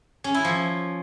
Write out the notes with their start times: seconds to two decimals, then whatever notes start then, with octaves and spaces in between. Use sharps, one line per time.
0.24 C#4
0.34 E4
0.44 F3